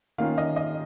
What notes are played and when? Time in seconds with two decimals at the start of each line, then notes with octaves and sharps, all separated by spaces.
0.18 D#3 A#3 C#4 F4 F5
0.38 D#5
0.56 D#5